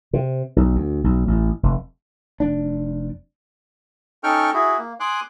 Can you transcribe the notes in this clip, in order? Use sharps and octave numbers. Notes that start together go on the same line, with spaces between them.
C3
B1
D2
B1
A1
F1
F1 D4
C#4 D#4 A4 G5 C#6 F6
E4 F#4 G#4
A#3
G#5 C6 D6 D#6 F#6